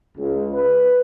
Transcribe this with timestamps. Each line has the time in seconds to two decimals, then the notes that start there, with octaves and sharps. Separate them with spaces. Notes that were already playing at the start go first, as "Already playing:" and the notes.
0.17 C#2
0.52 B4